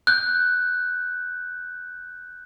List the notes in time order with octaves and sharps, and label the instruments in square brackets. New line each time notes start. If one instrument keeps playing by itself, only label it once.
[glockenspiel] F#6 G6